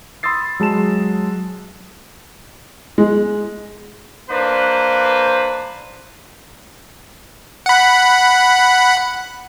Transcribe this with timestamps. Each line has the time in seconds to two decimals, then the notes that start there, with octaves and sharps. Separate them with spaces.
0.23 B5 C6 D#6 E6 A6 C7
0.60 F#3 G#3 A5 E7
2.98 G#3
4.29 A#3 D4 B4 C5
7.66 F#5 B5